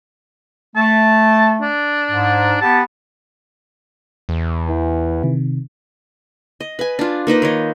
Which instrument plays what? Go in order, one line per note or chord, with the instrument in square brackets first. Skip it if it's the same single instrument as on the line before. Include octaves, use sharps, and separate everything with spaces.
[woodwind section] A3 [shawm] A5
[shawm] D4
[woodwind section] G#2
[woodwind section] B3 G4 [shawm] A5
[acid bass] E2
[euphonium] E3
[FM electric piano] C3 D#3
[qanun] D#5
B4 G#5
D4 F4
A#3 D#4 B4 D#5
D#3 C#5 D#5